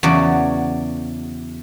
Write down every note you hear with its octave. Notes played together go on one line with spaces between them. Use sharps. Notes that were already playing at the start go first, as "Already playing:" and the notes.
E2 C#3 F#3 F#4 D5